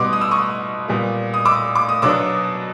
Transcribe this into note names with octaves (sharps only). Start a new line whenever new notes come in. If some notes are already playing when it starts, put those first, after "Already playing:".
Already playing: B2 G3 B3 C6 D6
D#6
E6
C#6 D#6
A#2 G3 B3
D#6
D6 E6
D6
D#6
B2 F#3 B3 D4 D6 E6